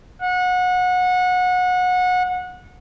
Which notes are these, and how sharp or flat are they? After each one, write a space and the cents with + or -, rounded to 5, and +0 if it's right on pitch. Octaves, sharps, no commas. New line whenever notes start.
F#5 -25